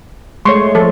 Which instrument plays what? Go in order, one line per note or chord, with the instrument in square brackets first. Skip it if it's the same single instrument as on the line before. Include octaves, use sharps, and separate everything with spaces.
[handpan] G#3 A3 C#5 [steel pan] C6 C#6
[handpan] F3 [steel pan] A4